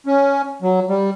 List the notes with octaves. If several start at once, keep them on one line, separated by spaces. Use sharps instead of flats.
C#4
F#3
G3